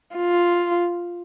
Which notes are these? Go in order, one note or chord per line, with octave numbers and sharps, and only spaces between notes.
F4